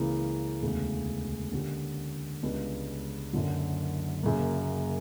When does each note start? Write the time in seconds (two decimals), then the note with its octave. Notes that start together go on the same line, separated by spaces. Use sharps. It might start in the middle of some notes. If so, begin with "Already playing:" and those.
Already playing: C#2 C#3 E3 A#3 E4
0.62 E1 D2 C#3
1.52 D3 A#3 C#4 G4
2.43 C#2 C#3 G3 B3 D4
3.33 F#1 F#2 D3 F#3
4.23 F#1 F#2 C#3 F#3 A#3